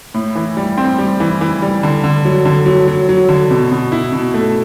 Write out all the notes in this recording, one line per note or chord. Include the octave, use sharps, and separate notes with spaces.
A2
E3
G3
C4
G3
E3
E3
G3
D3
D3
F#3
D3
F#3
F#3
F#3
D3
B2
B2
E4
B2
A3